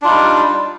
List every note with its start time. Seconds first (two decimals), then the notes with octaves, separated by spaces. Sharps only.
0.02 D4
0.04 F4
0.07 D#4
0.09 G3